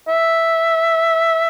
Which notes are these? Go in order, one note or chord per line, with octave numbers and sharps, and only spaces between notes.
E5